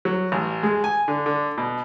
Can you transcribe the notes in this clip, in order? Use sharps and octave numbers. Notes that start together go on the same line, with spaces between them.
F#3
A1
G#3
G#5
D3
D3
B2